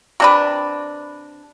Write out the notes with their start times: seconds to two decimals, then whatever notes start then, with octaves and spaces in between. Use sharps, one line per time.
0.20 C3 D4 B4